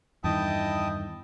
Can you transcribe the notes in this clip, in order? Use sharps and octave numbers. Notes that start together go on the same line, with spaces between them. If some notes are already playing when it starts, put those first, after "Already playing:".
E2 G2 D#3 E4 D#5 G5 A5 D#6